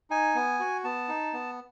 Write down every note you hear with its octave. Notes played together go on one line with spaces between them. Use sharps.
D#4 G#5
B3
F#4
B3 A5
D#4
B3